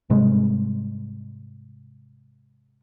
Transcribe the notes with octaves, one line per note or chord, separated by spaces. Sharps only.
G#2 C3 G3 G#3